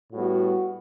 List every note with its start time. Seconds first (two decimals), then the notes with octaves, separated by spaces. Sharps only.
0.12 A2 G3 B3 F#4